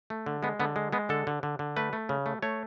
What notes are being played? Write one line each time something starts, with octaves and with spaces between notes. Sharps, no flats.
A3
D3
G#3 B3
D3 B3
G#3
G#3 B3
D3 A4
D3
D3
D3
A3 B4
A3
C#3
A3
A3 C#5